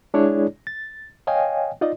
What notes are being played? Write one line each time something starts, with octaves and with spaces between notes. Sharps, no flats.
G#3 D4 E4 G#4 C#5 D5
A6
C#5 D#5 F5 G5 G#5
D#4 F4 D5 D#5